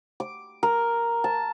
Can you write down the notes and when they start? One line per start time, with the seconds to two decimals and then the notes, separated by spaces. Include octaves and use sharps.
0.20 D6
0.63 A#4
1.24 A5